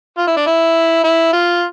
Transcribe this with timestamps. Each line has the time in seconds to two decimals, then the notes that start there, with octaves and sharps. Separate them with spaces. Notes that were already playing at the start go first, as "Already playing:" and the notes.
0.18 F4
0.27 E4
0.36 D4
0.47 E4
1.04 E4
1.33 F4